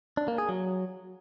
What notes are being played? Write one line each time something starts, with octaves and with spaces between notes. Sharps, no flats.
D4
A#3
G#4
F#3